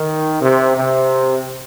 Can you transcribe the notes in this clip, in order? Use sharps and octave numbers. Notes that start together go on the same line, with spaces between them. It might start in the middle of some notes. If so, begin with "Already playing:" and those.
Already playing: D#3
C3
C3